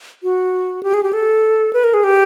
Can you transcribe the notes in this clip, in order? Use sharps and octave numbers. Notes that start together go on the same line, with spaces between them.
F#4
G4
G#4
G4
A4
B4
A#4
G#4
G4